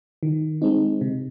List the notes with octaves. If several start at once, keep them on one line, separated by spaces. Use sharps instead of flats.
D#3
G#3 C4 D#4
C3